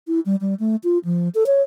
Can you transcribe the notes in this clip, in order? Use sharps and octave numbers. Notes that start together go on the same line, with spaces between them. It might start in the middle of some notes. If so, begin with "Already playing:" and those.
E4
G3
G3
A3
F4
F3
A4
C#5